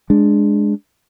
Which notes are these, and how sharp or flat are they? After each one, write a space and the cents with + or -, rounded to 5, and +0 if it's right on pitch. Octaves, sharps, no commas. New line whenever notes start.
G#3 +0 D4 +0